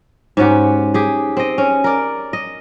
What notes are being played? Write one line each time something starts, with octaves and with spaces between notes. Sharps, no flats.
G#2 C#4 F#4 G4
G4 G#4
C4 D#5
C#4
A#4 D5
D#5